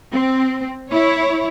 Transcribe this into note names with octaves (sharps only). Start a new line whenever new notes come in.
C4
E4 C#5